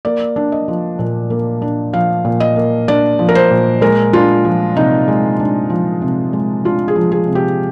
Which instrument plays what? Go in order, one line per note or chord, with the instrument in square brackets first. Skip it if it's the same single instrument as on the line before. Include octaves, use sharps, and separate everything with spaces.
[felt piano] A#3 D5
D4
D#5
F3
A#2
A#3
D4
F3 F5
A#2
D#5
A#3
D4 D5
F3
A#4
C5
A#2
G#3 A#4
D4 F4
F3
C3 D#4
G#3
D4
F3
C3
G#3
D4 F4
G#4
F3
G#4
C3
G4